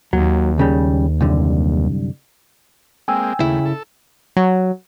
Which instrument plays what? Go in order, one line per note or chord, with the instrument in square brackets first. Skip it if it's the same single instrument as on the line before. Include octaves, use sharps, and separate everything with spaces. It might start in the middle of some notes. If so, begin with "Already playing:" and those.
[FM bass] D#2 [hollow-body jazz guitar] F#3
[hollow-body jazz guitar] C#2 C#3 G3
C2 F#2 D3
[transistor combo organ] G#3 A#3 C4 [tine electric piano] G5 G#5 E6
[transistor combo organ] D#2 A3 [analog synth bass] C#3 [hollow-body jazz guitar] E4
[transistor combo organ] A4
[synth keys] F#3